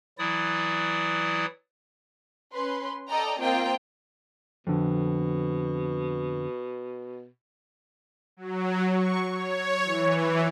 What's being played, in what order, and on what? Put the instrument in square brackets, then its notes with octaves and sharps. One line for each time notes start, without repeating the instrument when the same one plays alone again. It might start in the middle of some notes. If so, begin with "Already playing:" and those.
[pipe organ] E3 F#3 E4 D5 D#6
[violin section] C#4 B4 C6
A4 D5 D#5 G5 A#5
A#3 C4 F4 D#5 G5
[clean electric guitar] F2 D3 [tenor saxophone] B2
[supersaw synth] F#3
C#6
C#5
E3